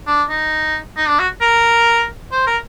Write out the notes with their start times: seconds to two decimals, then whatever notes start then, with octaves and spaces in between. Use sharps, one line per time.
0.07 D4
0.29 D#4
0.97 D#4
1.08 D4
1.19 F#4
1.42 A#4
2.32 C5
2.47 A#4